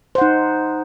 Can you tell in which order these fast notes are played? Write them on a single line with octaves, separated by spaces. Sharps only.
C5 F#5 D#4